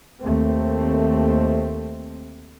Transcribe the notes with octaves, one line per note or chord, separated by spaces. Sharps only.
D#2 A3 C4